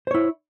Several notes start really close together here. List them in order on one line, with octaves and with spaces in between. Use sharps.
C5 C#5 E4